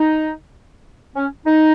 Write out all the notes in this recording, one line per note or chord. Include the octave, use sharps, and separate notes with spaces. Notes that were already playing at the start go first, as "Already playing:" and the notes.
Already playing: D#4
C#4
D#4